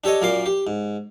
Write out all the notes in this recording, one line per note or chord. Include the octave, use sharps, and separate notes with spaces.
D4 G4 A4 C#5 D#5
F#2 A#2 A#4 D5 C6 D6
G4
G#2